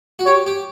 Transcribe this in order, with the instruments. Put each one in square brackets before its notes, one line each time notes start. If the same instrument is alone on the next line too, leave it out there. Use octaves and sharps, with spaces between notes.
[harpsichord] F#4
[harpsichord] G4 [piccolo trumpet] C#5
[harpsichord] G4